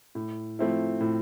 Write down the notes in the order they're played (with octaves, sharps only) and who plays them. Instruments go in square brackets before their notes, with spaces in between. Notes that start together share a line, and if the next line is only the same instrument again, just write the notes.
[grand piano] A2
F3 A3 C4 E4
A2